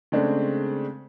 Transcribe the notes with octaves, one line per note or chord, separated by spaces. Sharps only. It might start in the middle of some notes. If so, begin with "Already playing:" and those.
C#3 G#3 A3 C4 D4